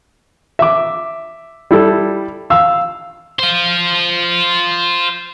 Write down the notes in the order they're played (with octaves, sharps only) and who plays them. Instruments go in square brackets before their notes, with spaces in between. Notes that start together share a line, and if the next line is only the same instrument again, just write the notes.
[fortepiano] E5 D6
G3 E4 A4
F5 E6
[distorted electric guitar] F4 C5